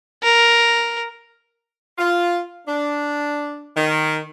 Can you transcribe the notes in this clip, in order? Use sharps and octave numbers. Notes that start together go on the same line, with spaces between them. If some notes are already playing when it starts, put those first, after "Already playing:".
A#4
F4
D4
D#3